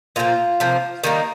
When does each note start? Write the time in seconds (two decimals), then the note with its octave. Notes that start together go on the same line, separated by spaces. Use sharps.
0.16 A#2 F3 A#3 F4
0.60 C3 F3 A#3
1.04 D#3 G3 A#3 D#4